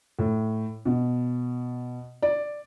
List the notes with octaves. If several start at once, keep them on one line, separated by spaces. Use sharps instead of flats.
A2
B2
D5